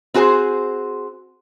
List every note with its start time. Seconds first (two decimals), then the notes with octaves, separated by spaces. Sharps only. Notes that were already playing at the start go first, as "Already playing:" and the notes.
0.14 C4 F#4 G#4 C5